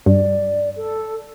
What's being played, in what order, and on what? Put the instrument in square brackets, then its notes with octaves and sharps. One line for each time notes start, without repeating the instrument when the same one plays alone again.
[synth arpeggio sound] G2 [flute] D5
[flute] A4